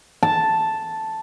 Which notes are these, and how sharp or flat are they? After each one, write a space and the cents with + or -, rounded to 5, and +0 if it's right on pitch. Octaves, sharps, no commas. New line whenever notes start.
A5 +0